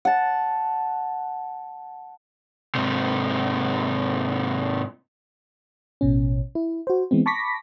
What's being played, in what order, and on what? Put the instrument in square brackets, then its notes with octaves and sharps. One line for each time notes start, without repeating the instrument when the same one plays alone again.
[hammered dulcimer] F#5 A5
[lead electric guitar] G#2 C3
[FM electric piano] A1 B2 C#4
E4
F#4 C5
E3 G#3 B3 C4
A5 B5 C#6 D6 A#6 B6